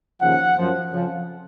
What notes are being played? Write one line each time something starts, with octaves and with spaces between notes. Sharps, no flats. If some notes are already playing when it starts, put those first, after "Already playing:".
D#2 C#3 F3 F#5
F#2 F3
F2 C#3 F3